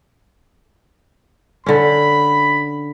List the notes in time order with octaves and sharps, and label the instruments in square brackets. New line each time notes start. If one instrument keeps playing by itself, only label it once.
[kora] D3 C#4 [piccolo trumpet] B5